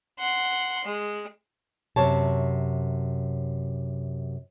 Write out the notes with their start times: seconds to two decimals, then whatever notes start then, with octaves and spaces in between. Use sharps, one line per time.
0.20 F#5 C6
0.85 G#3
1.96 F#2 C3 C#5 A5